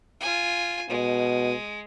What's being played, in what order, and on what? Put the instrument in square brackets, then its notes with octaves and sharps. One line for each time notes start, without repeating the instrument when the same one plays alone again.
[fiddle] F4 G#5
[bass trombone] B2 [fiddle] G#3